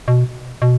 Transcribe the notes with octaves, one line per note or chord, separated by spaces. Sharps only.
B2
B2